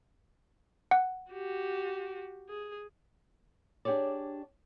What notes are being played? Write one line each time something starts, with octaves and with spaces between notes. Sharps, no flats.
F#5
F#4 G4
G#4
D4 G4 G#4 C#5 D5